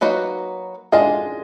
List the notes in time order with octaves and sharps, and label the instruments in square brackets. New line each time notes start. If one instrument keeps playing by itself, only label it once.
[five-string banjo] F#3 A#3 D#4 F#4 B4
[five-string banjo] G#3 D4 F4 G#4 [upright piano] D#5